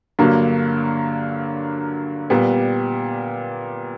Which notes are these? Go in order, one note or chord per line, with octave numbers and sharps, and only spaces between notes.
G2 D3 F#3 A#3
A#2 G3 B3